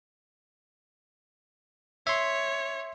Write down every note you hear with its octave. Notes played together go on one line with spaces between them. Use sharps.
C#5 E5 C6